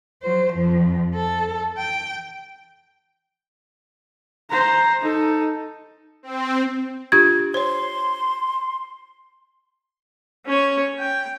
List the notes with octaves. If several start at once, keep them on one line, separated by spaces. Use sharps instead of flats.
F#3 C5
F2 F3
A4
G5
C5 A#5
D#4 A4
C4
D4 F4 G4 G#6
C5 C#5 C6
C#4 C#5
G5